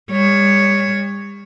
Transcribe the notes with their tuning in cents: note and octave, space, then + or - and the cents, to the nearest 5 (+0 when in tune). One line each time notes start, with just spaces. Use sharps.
G3 +35 C#5 +0